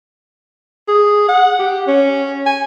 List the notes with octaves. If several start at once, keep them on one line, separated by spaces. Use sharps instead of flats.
G#4
F#5
G4
C#4
G#5